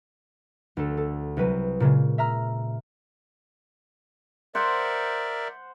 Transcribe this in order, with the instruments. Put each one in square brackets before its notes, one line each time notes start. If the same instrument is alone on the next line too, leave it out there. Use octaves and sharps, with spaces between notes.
[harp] D2 A4
A4
C2 F#3 B4 D#7
A#2 C#3 G#3
E5 A#5 F6
[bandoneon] A#4 D5 E5 [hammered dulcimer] C5 F#5